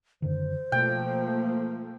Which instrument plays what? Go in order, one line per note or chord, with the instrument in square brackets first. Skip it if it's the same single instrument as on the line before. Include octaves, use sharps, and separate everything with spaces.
[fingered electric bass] F#2 D3 D#3 [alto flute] C5
[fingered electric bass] B2 [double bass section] F3 A3 A#3 [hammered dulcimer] G5